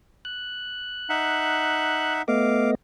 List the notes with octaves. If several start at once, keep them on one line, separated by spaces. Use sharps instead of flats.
F#6
D#4 E5 F#5
A3 B3 D#5 F5 D6